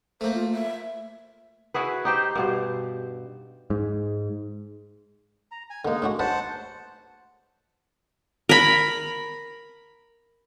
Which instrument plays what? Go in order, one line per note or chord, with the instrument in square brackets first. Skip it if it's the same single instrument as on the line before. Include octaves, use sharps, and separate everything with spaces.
[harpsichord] A3 A#3 [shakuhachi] C5
[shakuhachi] F4
E5
[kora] E4 F#4 G#4 B4
D#4 G4 C5
G2 B2 C5
[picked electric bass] G#2
[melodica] A#5
G#5
[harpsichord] D3 A#3 [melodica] G#3 D#4
[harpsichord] A2 D4 F#4
[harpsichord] F#3 B4 D#5 [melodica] C5 F#5 A5
[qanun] A#4 B5